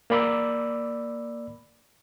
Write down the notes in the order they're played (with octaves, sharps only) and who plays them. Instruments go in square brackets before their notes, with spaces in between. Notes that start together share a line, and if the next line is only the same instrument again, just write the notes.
[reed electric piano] A#3 D5 B5 D6 E6